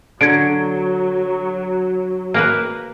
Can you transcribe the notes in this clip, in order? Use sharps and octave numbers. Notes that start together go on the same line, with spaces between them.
D3 F#3 G#6 D7
A#3 A#4 B4